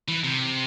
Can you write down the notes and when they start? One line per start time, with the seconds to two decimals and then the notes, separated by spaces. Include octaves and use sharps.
0.08 E3
0.24 C3